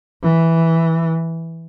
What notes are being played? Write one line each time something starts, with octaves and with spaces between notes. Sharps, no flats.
E3